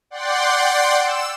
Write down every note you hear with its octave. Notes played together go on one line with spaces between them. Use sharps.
D5 F#5 G5 C6
E6 E7